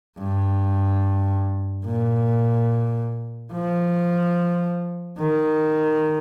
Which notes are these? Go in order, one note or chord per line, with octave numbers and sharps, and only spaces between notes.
G2
A#2
F3
D#3